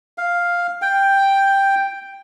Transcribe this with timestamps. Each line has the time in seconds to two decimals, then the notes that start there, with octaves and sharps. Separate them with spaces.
0.18 F5
0.82 G5